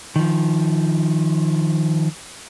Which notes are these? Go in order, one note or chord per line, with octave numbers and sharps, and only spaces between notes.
D#3 F3